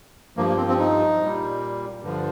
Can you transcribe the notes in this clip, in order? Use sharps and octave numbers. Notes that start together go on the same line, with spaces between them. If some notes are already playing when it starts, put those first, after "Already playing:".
G2 F3 A#3
A#3
C4
C4
D#4
A#2 G3
G2 D3 F3